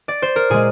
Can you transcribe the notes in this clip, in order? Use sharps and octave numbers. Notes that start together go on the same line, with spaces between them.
D5
C5
A#4
A#2 G#3 G#4